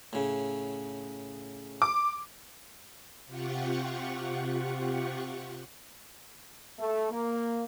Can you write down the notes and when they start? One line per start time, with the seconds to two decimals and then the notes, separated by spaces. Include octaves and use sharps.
0.13 A2 C#3
1.82 D6
3.26 C3 F4 G4 F#5 C#6
6.79 A3
7.11 A#3